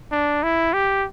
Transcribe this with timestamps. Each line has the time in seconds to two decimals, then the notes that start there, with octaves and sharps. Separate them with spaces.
0.12 D4
0.43 E4
0.74 G4